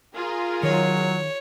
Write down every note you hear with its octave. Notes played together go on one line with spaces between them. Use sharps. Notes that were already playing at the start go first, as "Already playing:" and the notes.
F4 G#4 A#4
D#3 F#3 C#5